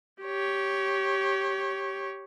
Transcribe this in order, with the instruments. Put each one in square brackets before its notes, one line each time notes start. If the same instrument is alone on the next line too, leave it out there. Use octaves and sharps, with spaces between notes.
[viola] G4 C#5